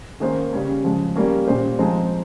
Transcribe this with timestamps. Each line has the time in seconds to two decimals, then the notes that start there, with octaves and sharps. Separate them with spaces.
0.20 D#3 A#3 C#4 G#4 C5
0.53 C#3 G3 C#4
0.84 C#3 F3 G#3
1.16 G3 A#3 C#4
1.48 A#2 G3 C#4 G#4 C5
1.79 F3 G#3 C4 D#4 G#4